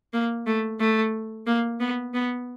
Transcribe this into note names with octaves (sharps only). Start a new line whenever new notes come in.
A#3
A3
A3
A#3
B3
B3